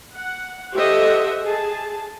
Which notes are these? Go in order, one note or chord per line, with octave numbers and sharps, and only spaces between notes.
F#5
G4 A4 C5 D#5 E5 F#5
G#4 A5